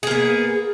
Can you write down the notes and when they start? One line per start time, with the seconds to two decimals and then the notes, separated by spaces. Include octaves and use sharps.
0.03 G#4
0.07 A#3
0.11 B3